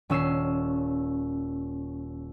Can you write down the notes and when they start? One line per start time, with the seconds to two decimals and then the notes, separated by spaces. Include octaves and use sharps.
0.10 D#1 C#4 E6 B6 C7